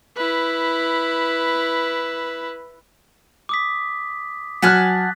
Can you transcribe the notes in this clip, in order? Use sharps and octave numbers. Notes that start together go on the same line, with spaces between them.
E4 B4
D6 D#6 B6
F#3 F#5 G#5 A5 F6 F#6 A6 B6